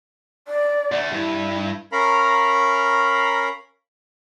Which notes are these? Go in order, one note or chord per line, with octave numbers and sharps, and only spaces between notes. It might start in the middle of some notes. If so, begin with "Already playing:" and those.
D5
D2 A3
G2 E4
C#4 A#4 F5 A#5 B5